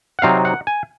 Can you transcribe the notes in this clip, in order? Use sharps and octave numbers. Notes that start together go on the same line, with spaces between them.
F#5
C3 F#3 C4 D#4 F5
F#5
G#5